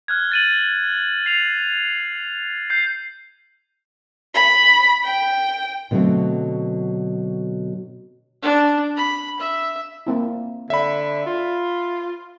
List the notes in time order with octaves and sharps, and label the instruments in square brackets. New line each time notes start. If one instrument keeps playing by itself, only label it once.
[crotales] F6 F#6 G#6
A6 D#7 F#7
C7 F7 F#7
G6 C7
[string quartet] B5
G5
[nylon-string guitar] B2 D3 F#3 G3 A3 C4
[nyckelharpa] D4
B5
E5
[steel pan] A#3 C4 E4
[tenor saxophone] D3 [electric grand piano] E5 B5
[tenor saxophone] F4